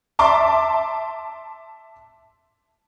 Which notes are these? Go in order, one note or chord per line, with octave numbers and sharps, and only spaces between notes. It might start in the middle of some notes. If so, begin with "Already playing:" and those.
E5 A5 C6 D6